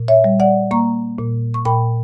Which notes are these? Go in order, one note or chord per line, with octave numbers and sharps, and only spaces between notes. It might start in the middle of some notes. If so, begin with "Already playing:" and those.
Already playing: A#2
C#5 E5
G3
D5 F#5
A#3 A#5 C#6
A#2
C#6
A#2 G5 B5